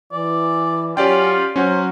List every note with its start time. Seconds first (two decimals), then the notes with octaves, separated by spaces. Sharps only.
0.12 E3 D5
0.97 F#3 C#4 F4 G4 D5 G5
1.56 F#3 C#4 F#4 C5